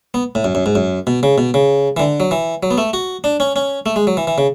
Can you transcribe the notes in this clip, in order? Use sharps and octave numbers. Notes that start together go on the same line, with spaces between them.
B3
A2
F#2
F#2
G#2
F#2
B2
C#3
B2
C#3
E3
D3
F#3
E3
F#3
B3
A3
F#4
D4
C#4
C#4
A3
G#3
F#3
E3
E3
C#3